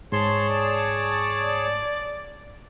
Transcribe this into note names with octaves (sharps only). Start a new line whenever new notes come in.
G#2 G#4 C#5 A5 C6
D5